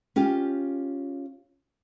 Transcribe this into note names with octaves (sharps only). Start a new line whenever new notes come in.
C#4 F4 G4